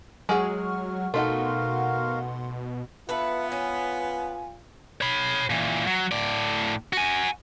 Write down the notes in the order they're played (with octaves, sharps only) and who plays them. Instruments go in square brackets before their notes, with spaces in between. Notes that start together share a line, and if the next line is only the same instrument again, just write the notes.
[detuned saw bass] F#3 [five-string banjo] G#3 G#4 [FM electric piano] F#5 C#6 F6
[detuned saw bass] B2 [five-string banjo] A3 D#4 [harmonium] F#4 A#4 F5 [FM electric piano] F#5 C6
[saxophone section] B3 [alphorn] F4 [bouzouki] A4 B4 [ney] E5
[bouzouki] C#4 [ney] G#5
[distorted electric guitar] C#5 B5
A#2 E3
F#3
A2 D5
F#4 G#5